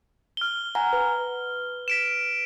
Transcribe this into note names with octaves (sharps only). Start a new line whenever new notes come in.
F6 G7
F#5 G#5 A#5
B4
B6 D7 E7